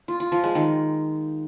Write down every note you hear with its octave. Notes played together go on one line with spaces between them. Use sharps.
F4
F4
F3
G#3
D#3